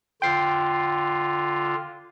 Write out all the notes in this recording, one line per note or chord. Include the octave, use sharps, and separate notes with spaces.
D3 F4 G5 C7